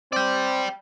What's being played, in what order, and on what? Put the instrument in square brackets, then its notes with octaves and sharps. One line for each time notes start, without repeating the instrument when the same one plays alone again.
[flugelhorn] C4 [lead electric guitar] D5 G5